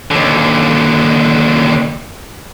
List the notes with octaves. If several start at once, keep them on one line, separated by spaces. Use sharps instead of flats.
D#2 D3